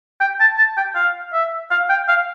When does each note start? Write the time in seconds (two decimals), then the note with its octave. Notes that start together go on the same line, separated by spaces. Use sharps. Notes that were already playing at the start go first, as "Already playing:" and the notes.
0.21 G5
0.40 A5
0.58 A5
0.77 G5
0.95 F5
1.33 E5
1.71 F5
1.90 G5
2.08 F5